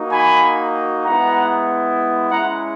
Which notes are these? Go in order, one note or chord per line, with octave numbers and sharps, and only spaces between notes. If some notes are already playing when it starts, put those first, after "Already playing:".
Already playing: A#3 D#4 F#4
G#5 B5
G#3 B3 E4 F#5 A#5
G#3 C#4 E4 F#5 A#5